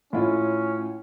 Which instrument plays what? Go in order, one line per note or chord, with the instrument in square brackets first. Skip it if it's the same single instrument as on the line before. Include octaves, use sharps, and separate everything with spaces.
[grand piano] A2 E4 F4 [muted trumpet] C#4